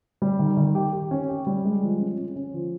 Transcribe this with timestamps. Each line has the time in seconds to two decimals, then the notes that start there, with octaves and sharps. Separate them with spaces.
0.22 G3
0.39 D#3
0.57 D#3
0.75 G4
0.93 G4
1.11 C#4
1.28 G4
1.47 G3
1.65 G#3
1.83 F3
2.00 C#4
2.18 C#4
2.36 C#4
2.54 F3